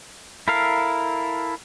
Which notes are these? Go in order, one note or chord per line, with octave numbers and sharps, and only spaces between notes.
E4 A4 A#4 F5